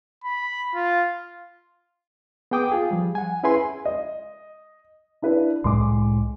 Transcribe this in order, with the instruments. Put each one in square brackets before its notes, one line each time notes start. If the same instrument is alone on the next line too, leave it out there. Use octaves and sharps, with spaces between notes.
[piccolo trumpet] B5
F4
[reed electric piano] B3 G#4 G5 D6 D#6
F4 G#4
F3 G3
F#5 G#5
C#4 E4 G#4 B4 G#5 C6
[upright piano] D#5
D4 E4 B4
[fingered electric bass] C2 A2 G#3 [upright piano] C6 D6